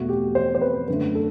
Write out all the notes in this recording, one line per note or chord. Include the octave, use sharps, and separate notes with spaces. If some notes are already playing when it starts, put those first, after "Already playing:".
Already playing: E2 B2 A3 F#4
G4
C5
C5
B4
F#2 D3 A3 B4
A4